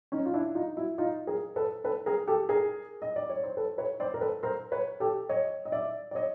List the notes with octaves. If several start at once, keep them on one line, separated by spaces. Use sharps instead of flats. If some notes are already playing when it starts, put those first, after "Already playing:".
C#4 D#4
F4
D4 E4
D#4 F4
E4 F#4
D#4 F4
G#4 A#4
A4 B4
A4 B4
G#4 A#4
G4 A4
G#4 A#4
D#5
D5
C#5
C5
A4 B4
B4 C#5
C5 D5
A#4
A4 B4
A#4 C5
B4 C#5
G4 A4
C#5 D#5
D#5
D5 E5
D5
C#5 D#5